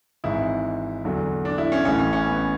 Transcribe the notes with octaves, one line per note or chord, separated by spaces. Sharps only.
G#1 G#2 E3 E4
E2 D3 F#3
D4
E4
C#4
A1 A2 E3 C#4
C#4
C#4
B3